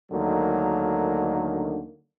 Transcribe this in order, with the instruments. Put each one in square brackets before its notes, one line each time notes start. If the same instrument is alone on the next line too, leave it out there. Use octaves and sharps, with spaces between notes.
[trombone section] D2 D3 D#3 F#3 G#3 A#3